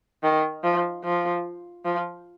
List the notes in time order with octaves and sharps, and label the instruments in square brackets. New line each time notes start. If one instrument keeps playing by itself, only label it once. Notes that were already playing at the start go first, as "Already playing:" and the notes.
[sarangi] D#3
F3
F3
F3